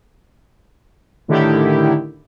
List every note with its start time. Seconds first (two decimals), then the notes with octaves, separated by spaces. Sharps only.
1.28 A2 D3 D#3 E4 G4